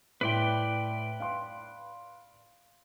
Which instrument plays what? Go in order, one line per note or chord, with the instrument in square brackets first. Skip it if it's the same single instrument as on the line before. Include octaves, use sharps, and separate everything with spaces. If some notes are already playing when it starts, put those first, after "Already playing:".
[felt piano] A2 C6 [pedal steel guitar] B4 D5 G5
[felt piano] F5 C6